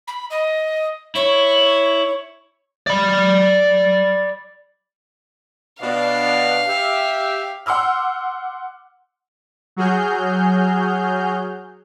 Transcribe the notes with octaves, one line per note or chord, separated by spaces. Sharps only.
B5
D#5
E4 C#5
D5 B5
B2 D4 F5
G4 E5
F#5 C6 D6 E6 F6
F#3 F#4 G#4 F6 G6